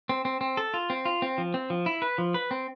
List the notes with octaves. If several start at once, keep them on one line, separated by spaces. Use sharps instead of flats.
C4
C4
C4
A4
F4
C4
F4
C4
F3
C4
F3
E4
B4
F3
B4
C4